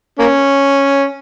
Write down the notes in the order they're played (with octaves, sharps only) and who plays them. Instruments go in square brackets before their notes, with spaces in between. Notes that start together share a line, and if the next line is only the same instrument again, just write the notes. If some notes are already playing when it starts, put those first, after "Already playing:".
[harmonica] A#3 C#4